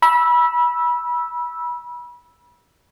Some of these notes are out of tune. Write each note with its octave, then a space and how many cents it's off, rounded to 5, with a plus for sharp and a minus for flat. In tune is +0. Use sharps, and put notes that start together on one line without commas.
B5 -30 E6 +0